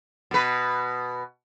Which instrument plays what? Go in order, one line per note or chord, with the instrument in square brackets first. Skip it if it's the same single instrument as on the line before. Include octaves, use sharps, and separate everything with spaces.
[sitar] B2 B4